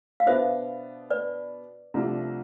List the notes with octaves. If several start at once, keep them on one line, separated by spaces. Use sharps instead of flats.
F5
B2 B3 D4 C5 E5
B4 D5
C2 C3 F3 A3 D4